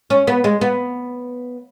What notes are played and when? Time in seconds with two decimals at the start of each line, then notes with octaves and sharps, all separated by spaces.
0.10 C#4
0.27 B3
0.44 G#3
0.61 B3